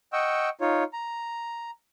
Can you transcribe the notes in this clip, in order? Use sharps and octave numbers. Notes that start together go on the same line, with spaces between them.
D#5 F#5 G5 C#6 E6
D#4 F4 C#5
A#5